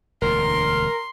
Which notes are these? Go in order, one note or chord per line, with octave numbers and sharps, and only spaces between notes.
E1 D2 D3 A#4 C6